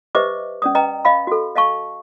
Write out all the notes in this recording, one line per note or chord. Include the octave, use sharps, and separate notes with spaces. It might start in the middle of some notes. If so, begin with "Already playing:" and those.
G4 B4 C5 D#5 E5 D6
C#4 D5 D#6
B4 D#5 G5 A#5
D#5 F5 B5
F#4 A4
D#5 F5 A5 C#6